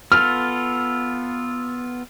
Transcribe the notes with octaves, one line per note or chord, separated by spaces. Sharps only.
B3 F4 A4 F6